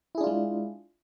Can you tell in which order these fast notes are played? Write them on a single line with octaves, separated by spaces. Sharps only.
E4 G#4 D4 F4 G#3